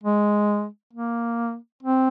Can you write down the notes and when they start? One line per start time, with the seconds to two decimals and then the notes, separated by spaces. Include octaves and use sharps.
0.03 G#3
0.93 A#3
1.83 C4